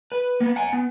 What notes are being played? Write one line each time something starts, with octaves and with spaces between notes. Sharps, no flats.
B4
A#3 B3
F#5 G#5
B3